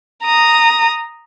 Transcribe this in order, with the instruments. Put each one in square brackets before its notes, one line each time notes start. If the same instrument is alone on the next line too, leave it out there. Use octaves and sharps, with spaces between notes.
[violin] A#5 D#6